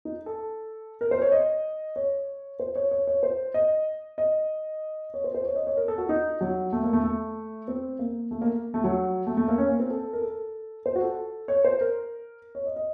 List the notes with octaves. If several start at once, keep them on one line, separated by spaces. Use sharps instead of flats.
D#4
A4
A#4
C5
C#5
D#5
C#5
C5
C#5
C#5
C#5
C5
D#5
D#5
C#5
C5
C5
C#5
D#5
C#5
A#4
A4
F#4
D#4
F#3
A3
A#3
A3
A3
C4
A#3
A3
A#3
A3
F#3
A3
A3
A#3
C#4
A#3
C4
A4
A#4
A4
C5
F#4
A4
C#5
C5
A#4
C#5
D#5
D#5